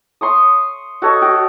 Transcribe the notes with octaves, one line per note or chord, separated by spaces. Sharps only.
C6 C#6 D#6
F#4 A4 C#5 D#5
F#4 G5